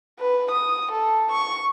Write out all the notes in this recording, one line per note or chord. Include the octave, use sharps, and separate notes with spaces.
B4
D#6
A4
C#6